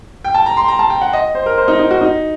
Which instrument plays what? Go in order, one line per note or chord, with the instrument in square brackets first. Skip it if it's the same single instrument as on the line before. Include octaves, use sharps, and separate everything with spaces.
[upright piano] G5
A5
A#5
C6
A#5
A5
G5
F#5
D#5
C5
A#4
C5
D#4
D#4
F#4
D#4